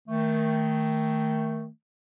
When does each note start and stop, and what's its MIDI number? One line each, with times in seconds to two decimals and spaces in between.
0.08 1.68 51
0.08 1.68 57